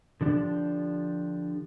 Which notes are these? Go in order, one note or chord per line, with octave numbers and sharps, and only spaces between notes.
D3 F3 D4 G4